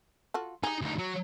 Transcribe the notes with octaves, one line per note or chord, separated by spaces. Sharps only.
F4 F#4 A4
G3 D#4 G#4
D2 D#4
F#3